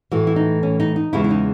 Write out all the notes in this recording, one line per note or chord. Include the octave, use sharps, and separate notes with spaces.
A2 E3 A3 F#4
E4
D#4
C#4
D#4
D#4
E2 C#3 E3 G#3 E4
E4
D#4